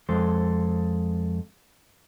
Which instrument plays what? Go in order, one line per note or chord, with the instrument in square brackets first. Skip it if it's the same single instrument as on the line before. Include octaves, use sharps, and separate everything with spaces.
[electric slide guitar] F2 G#3 A4 C5